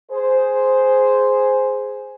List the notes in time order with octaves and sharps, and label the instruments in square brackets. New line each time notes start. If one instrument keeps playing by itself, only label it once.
[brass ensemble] G#4 C5